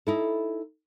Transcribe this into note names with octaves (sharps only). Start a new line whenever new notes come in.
D#4 E4 A4